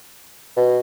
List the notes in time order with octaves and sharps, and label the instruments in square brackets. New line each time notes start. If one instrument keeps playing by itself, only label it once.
[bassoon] B2